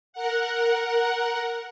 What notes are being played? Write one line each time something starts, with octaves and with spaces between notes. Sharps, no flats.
A#4 F#5